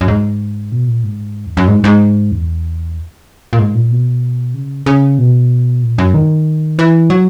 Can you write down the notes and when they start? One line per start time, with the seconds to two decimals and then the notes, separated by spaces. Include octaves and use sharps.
0.01 F#2
0.08 G#2
0.72 B2
0.88 A#2
1.04 G#2
1.46 E2
1.57 F#2
1.68 G#2
1.84 G#2
2.32 E2
3.53 A#2
3.59 G#2
3.75 A#2
3.91 B2
4.54 C#3
4.86 C#3
5.18 B2
5.83 A#2
5.98 F#2
6.14 D#3
6.79 E3
7.10 F#3